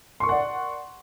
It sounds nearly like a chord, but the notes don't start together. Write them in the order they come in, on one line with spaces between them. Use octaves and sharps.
C6 C#6 A#4 F#5 D5